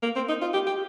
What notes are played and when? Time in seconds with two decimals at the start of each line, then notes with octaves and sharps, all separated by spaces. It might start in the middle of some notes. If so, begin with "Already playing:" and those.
0.03 A#3
0.16 C4
0.28 D#4
0.41 F4
0.54 G4
0.67 G4